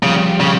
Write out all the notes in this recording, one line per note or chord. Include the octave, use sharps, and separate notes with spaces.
C#3 F3 G3
C#3